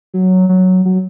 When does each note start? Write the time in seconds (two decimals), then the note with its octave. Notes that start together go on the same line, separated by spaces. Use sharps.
0.14 F#3
0.49 F#3
0.85 F#3